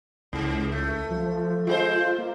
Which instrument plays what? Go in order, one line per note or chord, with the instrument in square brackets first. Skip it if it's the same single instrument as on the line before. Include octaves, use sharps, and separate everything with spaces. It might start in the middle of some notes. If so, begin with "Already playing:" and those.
[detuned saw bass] C#2 [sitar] G#2
[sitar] A3
[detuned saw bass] F3
[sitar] G#3 F#4 C5 [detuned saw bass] F4
[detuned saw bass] A#3